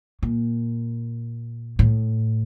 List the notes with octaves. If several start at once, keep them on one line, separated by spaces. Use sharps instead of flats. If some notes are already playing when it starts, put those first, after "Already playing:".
A#2
A2